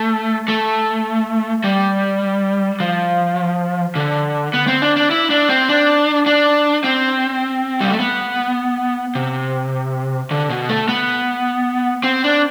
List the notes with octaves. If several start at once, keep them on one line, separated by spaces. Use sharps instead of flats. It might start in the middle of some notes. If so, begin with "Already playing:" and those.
Already playing: A3
A3
G3
F3
D3
B3
C4
D4
D4
E4
D4
C4
D4
D4
C4
G3
A3
B3
C3
D3
B2
A3
B3
C4
D4